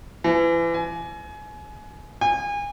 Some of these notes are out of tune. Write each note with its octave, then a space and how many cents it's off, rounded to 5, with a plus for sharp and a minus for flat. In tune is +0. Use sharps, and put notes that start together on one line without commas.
E3 +30
G#5 +30
G#5 -30